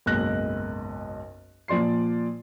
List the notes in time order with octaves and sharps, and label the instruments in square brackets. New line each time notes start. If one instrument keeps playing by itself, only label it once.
[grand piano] F#1 B1 G#2 F#6 A#6
A#2 F3 D5 C6 C7